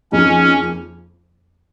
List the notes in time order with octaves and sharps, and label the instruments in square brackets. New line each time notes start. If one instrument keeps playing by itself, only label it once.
[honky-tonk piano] F2 C#3 A#3 D#4 [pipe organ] C#4